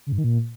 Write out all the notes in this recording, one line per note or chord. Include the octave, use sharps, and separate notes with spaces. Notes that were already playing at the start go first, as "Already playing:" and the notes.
C#3
G2
D#3
A#2